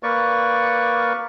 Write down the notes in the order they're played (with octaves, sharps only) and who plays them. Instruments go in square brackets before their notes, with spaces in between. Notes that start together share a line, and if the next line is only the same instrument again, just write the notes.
[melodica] A#3 B4 D5 C#6